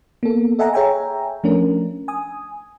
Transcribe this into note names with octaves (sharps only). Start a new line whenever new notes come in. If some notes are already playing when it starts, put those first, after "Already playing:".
A#3 B3 A4
A4 D#5 E5 F#5 G#5 A#5
G#4 C#5 E5 G5 G#5 A#5
F3 A3 C#4 D4 A#4
G#5 D#6